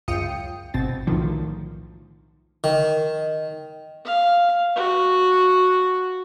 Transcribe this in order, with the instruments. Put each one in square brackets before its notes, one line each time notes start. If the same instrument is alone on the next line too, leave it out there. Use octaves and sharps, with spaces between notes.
[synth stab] C#2 F#2 F4 G5 D#6 C#7
G#1 B2 C4 A6
B1 E2 A2 D3 D#3 F3
[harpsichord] D#3
[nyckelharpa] F5
F#4